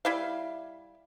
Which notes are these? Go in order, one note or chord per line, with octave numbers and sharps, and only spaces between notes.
G3 E4 E5 F5